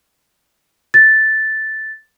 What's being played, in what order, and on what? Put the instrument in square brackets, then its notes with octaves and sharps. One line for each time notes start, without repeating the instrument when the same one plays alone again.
[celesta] A6